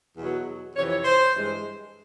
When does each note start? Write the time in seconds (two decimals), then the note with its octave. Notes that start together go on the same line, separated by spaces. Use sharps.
0.18 E2 B2 F#3
0.76 F2 C3 E3 C#5
0.90 C#5
1.05 C5
1.35 G2 E3 G#3